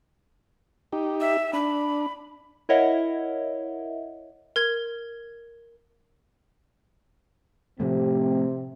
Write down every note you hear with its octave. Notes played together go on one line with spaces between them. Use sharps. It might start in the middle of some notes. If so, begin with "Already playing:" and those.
D#4 G4
E5
D4 B5
E4 A#4 C#5 D#5 E5 F#5
A#4 G#6
A2 C3 F3 A3 C4